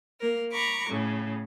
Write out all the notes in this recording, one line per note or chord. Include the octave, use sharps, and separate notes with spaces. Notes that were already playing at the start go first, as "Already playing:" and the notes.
A#3 A#4
A#5 B5 C#6 D6
A2 C#3